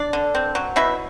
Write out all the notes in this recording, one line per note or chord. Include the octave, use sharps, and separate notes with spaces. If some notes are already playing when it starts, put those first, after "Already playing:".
Already playing: D4 D5
D3
C4
F#3
B2 E4 E5